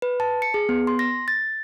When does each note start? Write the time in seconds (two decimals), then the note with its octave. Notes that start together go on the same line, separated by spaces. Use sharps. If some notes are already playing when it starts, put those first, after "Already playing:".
0.02 B4
0.20 A5
0.42 C#7
0.54 G#4
0.69 B3
0.87 C6
0.99 A#6
1.28 A6